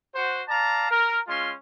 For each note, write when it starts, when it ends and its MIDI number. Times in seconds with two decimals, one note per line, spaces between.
0.14 0.41 66
0.14 0.41 72
0.48 0.88 74
0.48 0.88 77
0.48 0.88 81
0.48 0.88 82
0.90 1.19 70
1.27 1.52 56
1.27 1.52 61
1.27 1.52 65
1.27 1.52 84